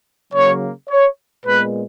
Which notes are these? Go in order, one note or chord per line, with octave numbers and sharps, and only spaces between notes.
C#3 F#3 A#3 C#5
C#5
A#2 G#3 B3 B4